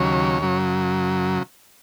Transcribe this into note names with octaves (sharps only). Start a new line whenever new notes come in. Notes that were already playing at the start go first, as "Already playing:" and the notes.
Already playing: D#2 C#3 F#3 C#5
F#2 C#3 F#3